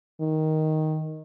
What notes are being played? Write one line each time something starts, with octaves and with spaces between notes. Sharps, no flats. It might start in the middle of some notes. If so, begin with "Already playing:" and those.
D#3